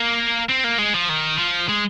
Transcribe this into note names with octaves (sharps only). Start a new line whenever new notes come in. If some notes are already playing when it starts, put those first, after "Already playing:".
Already playing: A#3
C4
A#3
G#3
F3
D#3
F3
G#3